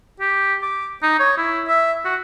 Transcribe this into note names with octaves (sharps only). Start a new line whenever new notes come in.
G4
D6
D#4
C#5
E4
E5
F#4